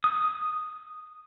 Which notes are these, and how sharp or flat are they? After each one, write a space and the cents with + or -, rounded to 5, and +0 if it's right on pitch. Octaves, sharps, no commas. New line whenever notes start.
D#6 -5